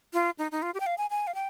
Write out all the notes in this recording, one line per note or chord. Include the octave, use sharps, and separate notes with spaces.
F4
D#4
D#4
F4
G4
G5
F5
G#5
G#5
F5
G5